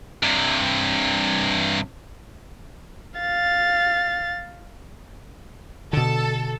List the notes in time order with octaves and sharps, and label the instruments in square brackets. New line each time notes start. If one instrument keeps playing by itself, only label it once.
[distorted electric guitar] G2 C3
[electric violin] F5 A6
[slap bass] B2 D3 [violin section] A4